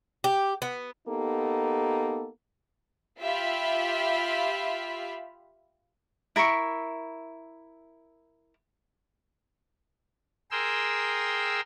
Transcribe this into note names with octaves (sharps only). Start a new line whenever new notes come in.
G4
B3
A#3 B3 D#4 G4 A4
F4 G4 E5 F5 B5
E4 A#4 E5 C#6
G#4 A#4 G5 C6 E6